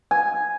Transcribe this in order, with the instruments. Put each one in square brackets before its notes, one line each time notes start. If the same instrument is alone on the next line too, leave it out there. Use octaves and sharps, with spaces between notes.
[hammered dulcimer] G#5